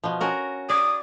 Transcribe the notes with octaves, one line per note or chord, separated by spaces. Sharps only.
B2 F3
C#4 F#4 A#4
D5 D#6